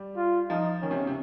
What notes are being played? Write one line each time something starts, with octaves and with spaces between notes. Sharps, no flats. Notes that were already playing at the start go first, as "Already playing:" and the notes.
Already playing: G3
F4
F3 D#4
D#3 C#4
C3
C#3
C3